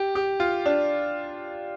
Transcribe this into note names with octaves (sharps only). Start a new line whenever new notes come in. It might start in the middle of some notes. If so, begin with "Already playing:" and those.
Already playing: G4
G4
F4
D4